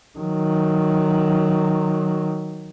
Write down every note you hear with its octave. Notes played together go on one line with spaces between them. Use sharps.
D#3 F#3